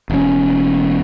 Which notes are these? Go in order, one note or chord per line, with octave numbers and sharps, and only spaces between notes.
E1 C#4